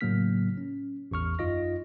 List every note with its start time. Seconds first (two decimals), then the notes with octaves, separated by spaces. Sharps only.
0.01 A2 C#3 F#3 A#3 F6 B6
0.58 C#4
1.11 A1 E2 C#6 F6
1.39 F#2 D#4 F4 D#5 A#6